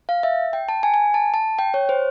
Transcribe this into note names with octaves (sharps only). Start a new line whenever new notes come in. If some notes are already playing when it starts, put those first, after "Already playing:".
F5
E5
G5
A5
G#5
G#5
A5
A5
G5
C#5
C5